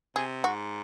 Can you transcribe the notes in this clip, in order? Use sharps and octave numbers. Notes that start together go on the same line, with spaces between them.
C3 G#4
G#2 F#4